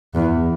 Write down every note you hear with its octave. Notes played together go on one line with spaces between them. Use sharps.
E2